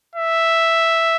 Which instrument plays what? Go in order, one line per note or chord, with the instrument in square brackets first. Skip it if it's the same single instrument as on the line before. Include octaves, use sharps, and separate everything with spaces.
[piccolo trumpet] E5